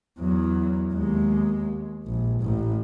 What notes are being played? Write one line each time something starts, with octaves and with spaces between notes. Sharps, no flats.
E2 F#3
D#2 G#3
A#1
A1 A2